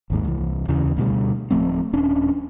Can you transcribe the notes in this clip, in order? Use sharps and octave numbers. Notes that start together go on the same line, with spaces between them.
G#1 D#2 G#2
C2 E3
D#2 C#3 E3
D2 B2 G3
D1 F3 A3 C4
D#1 C#4 D4